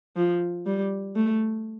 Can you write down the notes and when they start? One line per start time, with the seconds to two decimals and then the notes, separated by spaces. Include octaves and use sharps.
0.17 F3
0.67 G3
1.16 A3